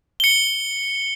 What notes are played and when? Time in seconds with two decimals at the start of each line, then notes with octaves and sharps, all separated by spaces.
0.20 C#7 G7